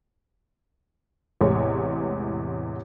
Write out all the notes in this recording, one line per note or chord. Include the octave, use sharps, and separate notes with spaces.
A1 E2 C3 G#3 C#5